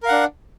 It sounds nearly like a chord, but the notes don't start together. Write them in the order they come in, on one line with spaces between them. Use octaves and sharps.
A#4 F5 F#5 D4